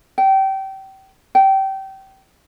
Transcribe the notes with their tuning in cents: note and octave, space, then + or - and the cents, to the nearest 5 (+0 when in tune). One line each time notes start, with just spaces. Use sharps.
G5 -25
G5 -25